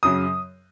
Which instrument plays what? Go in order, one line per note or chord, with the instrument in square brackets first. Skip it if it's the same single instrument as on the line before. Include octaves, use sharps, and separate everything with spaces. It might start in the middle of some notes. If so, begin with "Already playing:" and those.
[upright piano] F#2 C#3 F#3 D#6